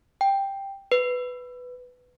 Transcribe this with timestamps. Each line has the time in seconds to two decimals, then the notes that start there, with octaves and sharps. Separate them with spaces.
0.21 G5
0.92 B4